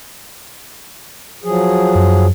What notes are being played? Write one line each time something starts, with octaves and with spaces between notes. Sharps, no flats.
F3 F#3 G#4
F#2